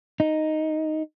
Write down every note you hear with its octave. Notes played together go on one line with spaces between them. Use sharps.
D#4